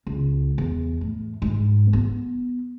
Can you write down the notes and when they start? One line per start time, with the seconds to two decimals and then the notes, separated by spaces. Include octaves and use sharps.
0.07 C#2
0.58 E2
1.01 A2
1.42 G#2
1.93 B3